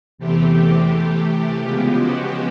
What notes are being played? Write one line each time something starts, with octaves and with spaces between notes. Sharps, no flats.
E2 C3 E3 A3 C4 G4
C3 E3 A3
C#3 F3 G#3 B3 G4
F#4